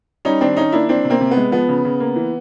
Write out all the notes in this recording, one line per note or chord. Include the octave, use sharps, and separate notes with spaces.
G3 C#4 D#4
D#3 C4 D4
D#3 C#4 D#4
A#3 D4 E4
E3 C4 D4
C3
A#3 C4
C3
B3
G#3
F3 B3
C#3
C#3
A#3
E3